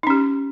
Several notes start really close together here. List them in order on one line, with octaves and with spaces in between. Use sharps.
D#4 C#4 G4